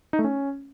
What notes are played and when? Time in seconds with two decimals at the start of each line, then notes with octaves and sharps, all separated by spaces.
0.13 D#4
0.19 A3
0.24 C#4